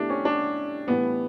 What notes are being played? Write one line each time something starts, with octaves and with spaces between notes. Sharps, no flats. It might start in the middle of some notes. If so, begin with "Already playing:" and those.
Already playing: B2 A3 D4 E4 G4
C#4
D4
A2 E3 G3 B3